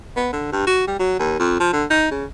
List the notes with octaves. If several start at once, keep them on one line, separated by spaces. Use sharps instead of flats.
B3
D3
G2
F#4
G3
F#3
D#2
F2
F3
D3
D#4
C#3